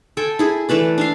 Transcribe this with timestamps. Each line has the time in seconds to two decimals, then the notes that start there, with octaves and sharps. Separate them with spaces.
0.17 A4 G5 G#5
0.39 E4 G#4 G#5
0.69 E3 A3 B4 D5
0.98 D4 E5 F5